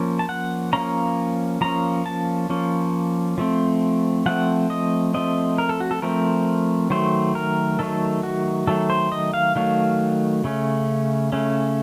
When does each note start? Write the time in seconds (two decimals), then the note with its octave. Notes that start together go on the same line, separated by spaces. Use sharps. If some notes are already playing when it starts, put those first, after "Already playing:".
Already playing: F3 A#3 C#4
0.19 A5
0.29 F#5
0.73 F3 A#3 C#4 A#5
1.61 F3 A#3 C#4 A#5
2.06 A5
2.50 F3 A#3 C#4
3.38 F3 A3 C4
4.26 F3 A3 C4 F#5
4.70 D#5
5.14 F3 A3 C4 D#5
5.58 A#4
5.69 A4
5.80 F#4
5.91 A4
6.02 F3 A3 C4 A#4
6.90 D#3 F#3 A3 C5
7.35 A#4
7.79 D#3 F#3 A3 A4
8.23 F#4
8.67 D#3 F#3 A3 A4
8.90 C5
9.12 D#5
9.34 F5
9.56 D#3 F#3 A3 F5
10.44 C#3 A3 C#4
11.32 C#3 A3 C#4